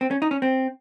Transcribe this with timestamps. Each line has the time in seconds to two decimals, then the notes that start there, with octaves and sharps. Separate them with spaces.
0.01 C4
0.11 C#4
0.22 D#4
0.31 C#4
0.42 C4